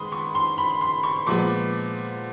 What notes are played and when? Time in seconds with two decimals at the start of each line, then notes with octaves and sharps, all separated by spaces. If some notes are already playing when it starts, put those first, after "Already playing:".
Already playing: D#3 G#3 B3 B5 C6 D#6
0.12 C#6
0.35 C6
0.58 B5
0.81 C6
1.03 C#6
1.26 A#2 F3 G#3 B3 D6